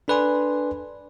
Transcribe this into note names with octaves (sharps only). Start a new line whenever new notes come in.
D4 A4 B4 D5 G#5 C6